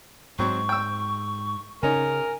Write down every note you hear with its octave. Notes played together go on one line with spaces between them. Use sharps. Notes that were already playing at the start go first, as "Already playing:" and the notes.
G#2 F#3 C4 C#6
G5 E6
C#3 C#4 D#4 A#4 G#5